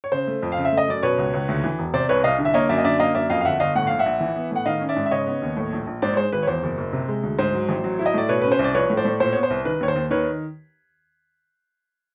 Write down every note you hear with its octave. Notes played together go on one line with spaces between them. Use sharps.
C#5
C#3 C5
A3
F2
F5
C#3
E5
A3
D#5
F#2 D5
B2 B4 C#5
C#2
C#2
D2
E3
E1
C3 C5 D5
C2 B4 C#5
C2 D#5 F5
D3
E5
A#3 C#5 D#5
F#2 D5 E5
D#5
D3 D5 E5
A#3 D#5 F5
F#2 D5 E5
F2 D#5 F5
F5
G1 E5 F#5
G1 D#5 F5
A2 F#5
A#1 F5
E5 F#5
A#1
E3
B3
A2 F#5
D#3 D#5 F5
C#4
D5 E5
G#2
E5
C#3 C#5 D#5
B3
D#2
A2
A#1
A#1
G#2 C5 D5
C#5
G#3 C5
G#1 B4
C#5
E2 C5
F#1
F#1
C3
G#3
D2
G#2 C5
F#3
A1
F#3
E4
D#5
A2 D5
B2 B4 C#5
C#4 B4
C5
C2
D5
F3 B4 C#5
A2
C5 D5
A2
A#2 C5
B3 C#5
C5
C2
D#3 B4
D#2 C#5
C5
D#2
D#3 B4 C#5